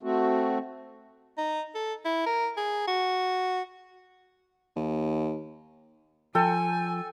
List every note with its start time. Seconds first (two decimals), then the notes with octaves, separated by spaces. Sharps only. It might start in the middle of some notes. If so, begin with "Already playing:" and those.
0.03 A3 C4 F#4
1.38 D#4
1.75 A4
2.05 E4
2.26 A#4
2.57 G#4
2.87 F#4
4.76 D#2
6.35 F3 A4 G5 G#5